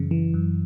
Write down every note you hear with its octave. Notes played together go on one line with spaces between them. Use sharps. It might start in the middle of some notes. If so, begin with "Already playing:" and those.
Already playing: F#2 C#3 E3
E3
F#2